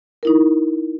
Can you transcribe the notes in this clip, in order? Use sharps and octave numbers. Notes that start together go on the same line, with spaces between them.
D#4 E4 A#4